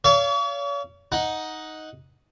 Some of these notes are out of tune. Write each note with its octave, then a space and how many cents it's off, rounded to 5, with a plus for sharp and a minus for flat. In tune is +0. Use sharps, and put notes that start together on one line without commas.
C#5 +40 F5 -25
D#4 +10 F#5 -5